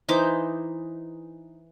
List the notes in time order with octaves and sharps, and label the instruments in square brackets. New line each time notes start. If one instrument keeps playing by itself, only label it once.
[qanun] E3 D#4 C5 D6